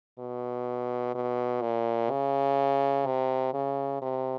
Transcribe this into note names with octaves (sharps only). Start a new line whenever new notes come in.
B2
B2
A#2
C#3
C3
C#3
C3